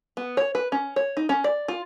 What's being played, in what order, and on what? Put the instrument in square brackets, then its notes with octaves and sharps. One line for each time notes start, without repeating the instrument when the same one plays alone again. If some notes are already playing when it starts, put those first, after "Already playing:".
[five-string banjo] B3
C#5
B4
C#4
C#5
D#4
C#4
D5
F4